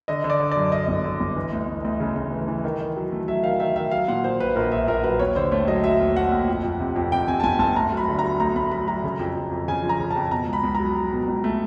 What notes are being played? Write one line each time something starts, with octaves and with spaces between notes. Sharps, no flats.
D3 D#5
D3
D5
D3
F#2 D5
F#2 D#5
G1
D3
G1
E3
D2
D2
D2
C#3
D2
E3
E3
D#3
D#3
F#3
A3
F#3 E5
D#3 F5
D#3 E5
D#3 E5
F#3 F5
A#2 F#5
A#2 C5
A#1 B4
A#1 A#4
A#1 E5
A#1 A#4
F#3 B4
D#2 C#5
D3 C5
A3 C#5
F#3 D#5
F#3 E5
D#2
A3 F#5
D#2
F2
F2
C3
F2
C3 G5
C3 G#5
A5
G1 G#5
G1 A5
D2 A#5
F#3
B5
D3
A#5
F#3
D2 A#5
D2 B5
F#3 B5
F#3 A#5
C#3
F2
F2
F2
C#3 G#5
F3
A#5
C#3
A5
F2
B2 A#5
C#2
B5
C#2
A#5
F#3
F#3
B2
C#2
A3